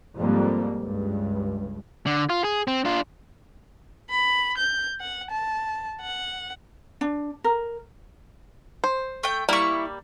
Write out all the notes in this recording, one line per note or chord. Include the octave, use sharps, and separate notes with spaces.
F2 G#2 G3 A#3
C#2 G2
D3
F4
G#4
C4
D4 F4
B5
G6
F#5
A5
F#5
D4
A#4
C5
A3 G5
G3 A#3 E4 C#6